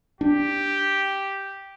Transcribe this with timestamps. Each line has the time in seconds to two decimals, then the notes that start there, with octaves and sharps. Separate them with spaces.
0.21 D4 G4